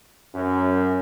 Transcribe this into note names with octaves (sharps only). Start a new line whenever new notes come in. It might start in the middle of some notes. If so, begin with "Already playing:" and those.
F#2